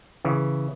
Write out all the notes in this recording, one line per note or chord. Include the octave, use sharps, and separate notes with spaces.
C#3 E3